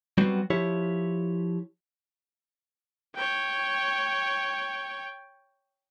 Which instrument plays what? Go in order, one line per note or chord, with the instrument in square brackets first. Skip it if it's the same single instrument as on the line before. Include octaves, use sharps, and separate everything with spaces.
[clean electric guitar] F#3 G3 B3 C4 F#4
F3 E4 G4 C#5
[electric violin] C#5 G5